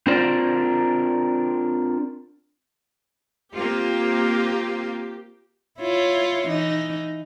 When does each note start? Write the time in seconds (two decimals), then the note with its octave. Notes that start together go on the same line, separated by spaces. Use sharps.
0.07 C4 D4 F4 A#4 C5 D5
3.54 A#3 C4 F4 G4
5.79 E4 F4 C#5
6.48 E3 D#4